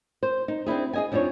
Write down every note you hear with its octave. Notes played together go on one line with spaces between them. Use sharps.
C5
D#4
C4 D4 E4 G#4
G#4 D#5 G#5
F2 F3 D4 D#4 C#5